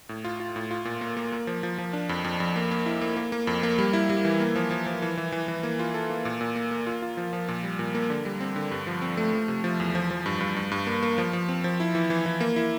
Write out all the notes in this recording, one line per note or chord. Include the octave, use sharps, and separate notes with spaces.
A2
F4
F4
A2
F4
A#2
A#3
A#3
A#3
F3
F3
F3
D4
F2
F2
F2
A#3
A#3
E4
A#3
A#3
A#3
F2
A#3
G3
E4
G3
E3
A#3
F3
F3
F3
E3
E3
E3
E3
A#3
F4
A4
A#3
A#2
A#2
A#3
A#3
F4
F4
F3
F3
A#2
G3
A#2
A#3
D3
G3
C4
D3
G2
F3
C4
A3
F3
C3
F3
E2
F3
F3
G2
G2
G2
G2
A#3
A#3
F3
F3
C4
F3
E4
E3
E3
E3
A#3
E4